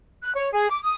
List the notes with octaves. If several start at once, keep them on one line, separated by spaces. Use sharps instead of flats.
F#6
C#5
G#4
D6
D#6